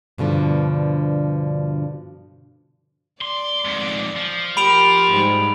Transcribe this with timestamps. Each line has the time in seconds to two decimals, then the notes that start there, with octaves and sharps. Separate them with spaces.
0.18 G2 B2 D3 F3
3.22 D5 C6
3.65 F2 G#2
4.17 F3
4.57 G4 A#4 B5 D7 F7
5.10 G#2 G3